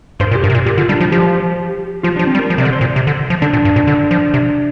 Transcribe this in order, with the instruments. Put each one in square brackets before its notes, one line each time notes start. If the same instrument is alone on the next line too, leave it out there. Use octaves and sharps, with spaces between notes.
[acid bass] G2 [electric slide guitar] C5
[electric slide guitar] A#4
[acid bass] A#2
[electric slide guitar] G4
[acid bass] G2 [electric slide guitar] A#4
[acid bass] C3
A#2
[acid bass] A#2 [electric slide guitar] G4
[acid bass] D3 [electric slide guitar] F4
[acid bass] G3 [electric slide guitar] D4
[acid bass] F3 [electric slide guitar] F4
[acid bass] F3 [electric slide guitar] G4
[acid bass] F3 [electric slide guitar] F4
[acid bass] F3 [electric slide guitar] D4
[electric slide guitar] C4
[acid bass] G3
[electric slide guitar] A#4
[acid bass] F3
C3
[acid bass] D3 [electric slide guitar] D5
[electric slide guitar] C5
[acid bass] A#2
C3
D3
F3
[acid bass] D3 [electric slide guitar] D4
[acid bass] A#2
G2
A#2
D3
F3
C3